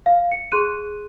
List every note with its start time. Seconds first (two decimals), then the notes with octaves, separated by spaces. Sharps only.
0.06 F5
0.32 C#7
0.52 G#4 C6 F#6 D#7